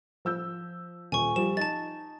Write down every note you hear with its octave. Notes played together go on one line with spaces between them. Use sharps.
F3 E6 G6
D#1 G#5 C#6
F3 G3 E7
D#4 A5 A6